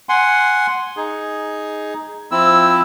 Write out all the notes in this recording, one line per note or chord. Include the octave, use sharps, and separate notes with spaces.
F#5 G#5 C6
D#4 G#4
F3 C4 E4 E6